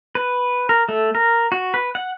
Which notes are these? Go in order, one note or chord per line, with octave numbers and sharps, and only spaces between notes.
B4
A#4
A3
A#4
F#4
B4
F#5